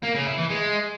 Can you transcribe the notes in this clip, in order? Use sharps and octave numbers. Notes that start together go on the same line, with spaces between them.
A#3
C#3
E4
E3
G#3